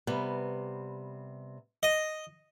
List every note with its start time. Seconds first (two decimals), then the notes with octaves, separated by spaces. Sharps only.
0.07 C3 G3 B3
1.83 D#5